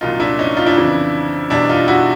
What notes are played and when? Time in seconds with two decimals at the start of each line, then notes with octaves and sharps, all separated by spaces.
0.01 C2 A#2 F#3 D#4 F4
0.20 D4 E4
0.39 C#4 D#4
0.57 D#4 F4
0.66 D4 E4
0.76 F2 C#3 E3
1.50 E2 B2 G3 D4 E4
1.69 D#4 F4
1.88 E4 F#4